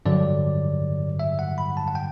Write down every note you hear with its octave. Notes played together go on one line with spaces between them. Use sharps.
G2 D3 F#3 D5
E5
F#5
B5
A5
F#5
G5